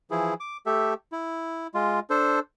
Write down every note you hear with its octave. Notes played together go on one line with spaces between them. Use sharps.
E3 F3 E4 G#4
D6
A3 G4 A4 E5
E4
G#3 F4
D4 A4 C5